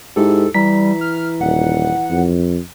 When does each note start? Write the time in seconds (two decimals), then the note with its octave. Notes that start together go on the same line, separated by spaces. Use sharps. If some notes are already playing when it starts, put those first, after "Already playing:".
0.16 G#2 E4 G4 A4
0.54 E3 G3 A#5 B6
1.01 F6
1.41 D#1 F#5
2.11 F2